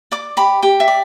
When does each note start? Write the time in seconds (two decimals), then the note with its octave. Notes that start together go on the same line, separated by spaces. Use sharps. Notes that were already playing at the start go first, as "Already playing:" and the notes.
0.12 D5 D6
0.37 G4 B5
0.62 G4 G5
0.80 E5
0.88 D5